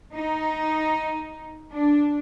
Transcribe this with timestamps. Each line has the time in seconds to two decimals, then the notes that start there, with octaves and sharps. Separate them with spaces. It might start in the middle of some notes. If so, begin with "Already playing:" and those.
0.13 D#4
1.72 D4